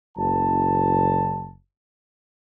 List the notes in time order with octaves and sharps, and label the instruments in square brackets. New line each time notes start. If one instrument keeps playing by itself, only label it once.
[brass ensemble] F#1 A5